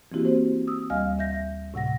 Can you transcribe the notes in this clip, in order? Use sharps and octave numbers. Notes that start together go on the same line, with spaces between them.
E3 A#3 C4 E4 F#4 G4
C4 F#4 C5
D#6 E6
D2 G3 D#5 F5 G#5 F6
E5 G6 A#6
A2 C3 F#5 A#6